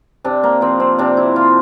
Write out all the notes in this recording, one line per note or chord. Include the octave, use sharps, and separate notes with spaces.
C3 D4
A#3
F3 C4
C4
C3 D4
E4
F3 F4